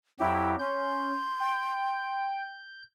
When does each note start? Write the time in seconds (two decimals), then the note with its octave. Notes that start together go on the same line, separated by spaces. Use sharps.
0.20 F2 F#3 E4 G4 G5
0.59 C#4 C6 G6
1.40 G5